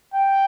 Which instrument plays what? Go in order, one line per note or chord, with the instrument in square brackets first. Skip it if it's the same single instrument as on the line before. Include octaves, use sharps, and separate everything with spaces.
[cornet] G5